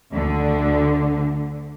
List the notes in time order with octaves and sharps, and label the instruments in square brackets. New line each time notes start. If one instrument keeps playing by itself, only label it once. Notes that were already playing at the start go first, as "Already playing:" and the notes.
[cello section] D2 D3